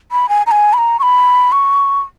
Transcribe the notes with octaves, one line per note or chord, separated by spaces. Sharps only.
B5
G#5
A#5
G#5
B5
A#5
C#6
B5
C#6